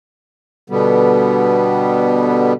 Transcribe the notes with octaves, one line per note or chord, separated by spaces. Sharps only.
B2 D3 G3 B3